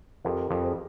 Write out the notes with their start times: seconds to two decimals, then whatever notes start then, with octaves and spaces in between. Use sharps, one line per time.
0.24 F2 G4 A#4
0.51 F2
0.63 G#4 C5